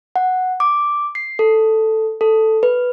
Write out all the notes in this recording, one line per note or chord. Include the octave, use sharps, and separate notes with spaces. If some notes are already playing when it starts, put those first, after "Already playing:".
F#5
D6
C7
A4
A4
B4